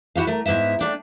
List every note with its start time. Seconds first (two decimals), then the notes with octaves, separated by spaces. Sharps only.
0.15 E4 F#4 G4 F5
0.27 A3 A#4
0.46 G#2 B3 E4 E5
0.79 A3 D4 G5